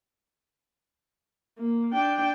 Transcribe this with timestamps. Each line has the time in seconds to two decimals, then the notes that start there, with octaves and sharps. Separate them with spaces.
1.58 A#3
1.93 D4 G5